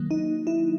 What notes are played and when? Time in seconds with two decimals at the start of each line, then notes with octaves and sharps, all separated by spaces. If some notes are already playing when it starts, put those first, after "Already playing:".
Already playing: D#3 F#3 A#3
0.11 D#4
0.47 E4